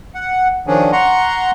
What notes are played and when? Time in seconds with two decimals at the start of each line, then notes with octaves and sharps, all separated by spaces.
0.15 F#5
0.67 D#3 F3 C#4 D4 G#4
0.92 F#5 A#5 C6 C#6